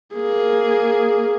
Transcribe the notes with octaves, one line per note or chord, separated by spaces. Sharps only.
A#3 G#4